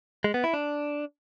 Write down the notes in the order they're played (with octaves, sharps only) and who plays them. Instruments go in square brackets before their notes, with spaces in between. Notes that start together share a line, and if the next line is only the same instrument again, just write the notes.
[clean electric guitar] G#3
B3
E4
D4